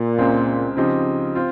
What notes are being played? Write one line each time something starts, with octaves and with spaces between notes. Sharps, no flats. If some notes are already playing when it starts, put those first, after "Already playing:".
Already playing: A#2
C#2 C#3 G#3 C4
C#3 F3 C4 D#4 G4
C4 F4